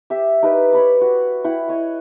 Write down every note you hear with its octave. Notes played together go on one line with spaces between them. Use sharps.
G4 E5
D#4 G4 A#4 B4
C#5 B5 D6
F#4
E4 F#5 G5
C#5 D#5